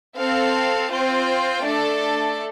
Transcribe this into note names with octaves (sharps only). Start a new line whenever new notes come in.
C4 A4 F5 A5
C4 F4 C5 G5
A3 D4 A4 D5 A5